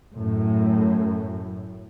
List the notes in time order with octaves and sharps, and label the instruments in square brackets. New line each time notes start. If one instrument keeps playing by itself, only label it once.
[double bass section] F#2 A2